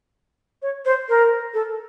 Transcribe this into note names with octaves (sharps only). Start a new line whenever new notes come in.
C#5
C5
A#4
A4